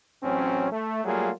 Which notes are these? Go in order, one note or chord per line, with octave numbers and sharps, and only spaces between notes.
A1 F#3 C4 C#4
A3
F#3 G3 A3 A#3 F4 G#4